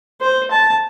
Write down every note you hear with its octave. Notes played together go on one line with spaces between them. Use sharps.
C5
A5